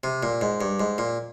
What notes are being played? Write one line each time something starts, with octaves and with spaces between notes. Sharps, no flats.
C3
A#2
G#2
G2
G#2
A#2